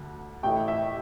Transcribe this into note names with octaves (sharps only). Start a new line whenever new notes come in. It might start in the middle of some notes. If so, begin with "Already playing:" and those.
Already playing: D2 D3
A1 A2 A3 E4 G5
E5